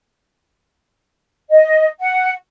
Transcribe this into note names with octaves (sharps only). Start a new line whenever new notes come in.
D#5
F#5